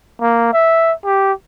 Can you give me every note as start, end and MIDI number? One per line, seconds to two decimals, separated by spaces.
0.21 0.51 58
0.53 0.93 76
1.05 1.32 67